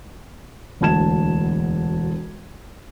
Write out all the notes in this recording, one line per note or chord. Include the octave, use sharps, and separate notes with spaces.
E1 D2 A5 G#6 E7